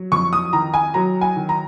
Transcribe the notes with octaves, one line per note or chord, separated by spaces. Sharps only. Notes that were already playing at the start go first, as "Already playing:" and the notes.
Already playing: F#3
F2 C#6
D#6
D#3 A#5
G#5
F#3 A#5
G#5
D#3
A#5